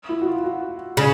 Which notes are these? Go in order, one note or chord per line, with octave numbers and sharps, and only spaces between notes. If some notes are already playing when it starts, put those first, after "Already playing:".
E4
F#4
F4
F#4
C#3